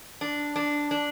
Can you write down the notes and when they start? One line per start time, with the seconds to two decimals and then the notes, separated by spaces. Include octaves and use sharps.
0.21 D4
0.56 D4
0.91 D4